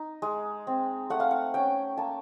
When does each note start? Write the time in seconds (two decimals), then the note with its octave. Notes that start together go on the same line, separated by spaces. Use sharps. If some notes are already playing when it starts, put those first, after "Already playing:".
Already playing: D#4
0.22 G#3
0.67 C4
1.10 A3 F#5
1.20 F5
1.31 F#5
1.54 C#4 G5
1.97 A#3 A5